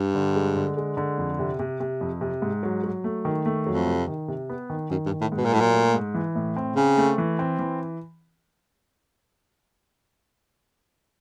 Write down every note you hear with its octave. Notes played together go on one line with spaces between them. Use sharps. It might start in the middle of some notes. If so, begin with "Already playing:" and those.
Already playing: G2
D3
G#3
D3
G#3
D3
F2
C3
C3
C3
F2
C3
G#2
F#3
F#3
A3
D#3
A3
F2 F#3
C3
D#3
C3
B3
D#3
F#2 D#3
G2
D#3
A2
G#2
B2
A#2
A2 F#3
A#2
A3
G#2
E3
A2
C4
C#3 C4
A3
E3
C4
E3